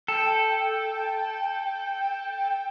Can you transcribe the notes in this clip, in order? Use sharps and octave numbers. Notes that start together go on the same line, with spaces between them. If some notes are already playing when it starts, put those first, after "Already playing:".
A4 G5